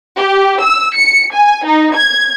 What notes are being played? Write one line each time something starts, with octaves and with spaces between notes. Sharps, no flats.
G4
E6
C#7
G#5
D#4
G#6